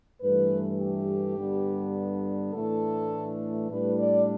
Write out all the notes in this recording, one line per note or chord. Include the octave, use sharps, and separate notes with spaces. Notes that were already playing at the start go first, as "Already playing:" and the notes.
G2 E3 A3 B4
G4
G2 D3 B3 D4
A2 E3 A3 D4 A4
A2 G3 D4 B4
D5